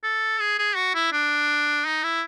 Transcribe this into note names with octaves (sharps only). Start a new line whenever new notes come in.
A4
G#4
G#4
F#4
E4
D4
D#4
E4